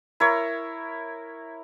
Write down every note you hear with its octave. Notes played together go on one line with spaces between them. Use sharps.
E4 A#4 C#5